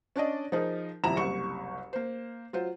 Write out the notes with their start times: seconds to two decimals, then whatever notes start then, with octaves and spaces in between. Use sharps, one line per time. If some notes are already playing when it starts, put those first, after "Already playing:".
0.16 C#4 D4 D5 D#5
0.52 F3 D#4 G#4 A#4
1.04 D#1 F2 C3 E4 A#5 E7
1.17 F#1 C2 G3 C#6 C#7
1.93 A#3 C5
2.53 F#3 F4 C5